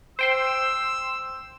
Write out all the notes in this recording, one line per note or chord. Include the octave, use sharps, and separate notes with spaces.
C5 G5 C6 E6